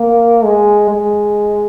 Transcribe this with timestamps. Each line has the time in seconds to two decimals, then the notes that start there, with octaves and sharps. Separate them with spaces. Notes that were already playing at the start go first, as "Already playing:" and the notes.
Already playing: A#3
0.44 G#3
0.90 G#3